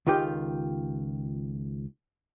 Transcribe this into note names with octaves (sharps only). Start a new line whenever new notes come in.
C#2 D#3 F4 G4 G5